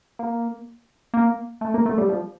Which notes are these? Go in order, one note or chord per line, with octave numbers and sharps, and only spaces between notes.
A#3
A#3
A3
A#3
A3
G3
F3